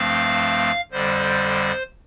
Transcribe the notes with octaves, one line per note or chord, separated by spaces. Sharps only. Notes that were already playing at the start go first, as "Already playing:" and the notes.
Already playing: G2 F3 A3 C4 F5
F2 D3 G3 C5